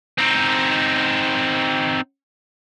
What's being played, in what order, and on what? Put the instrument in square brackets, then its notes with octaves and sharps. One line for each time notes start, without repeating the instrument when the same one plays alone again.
[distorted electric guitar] C4 D#4